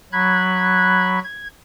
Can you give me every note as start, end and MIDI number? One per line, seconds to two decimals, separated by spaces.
0.12 1.19 54
0.12 1.19 83
0.12 1.19 90
0.12 1.19 92
1.24 1.47 92